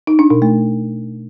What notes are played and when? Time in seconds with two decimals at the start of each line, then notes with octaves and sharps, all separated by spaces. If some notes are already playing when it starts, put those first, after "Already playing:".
0.07 D#4
0.19 D4
0.30 B2
0.42 A3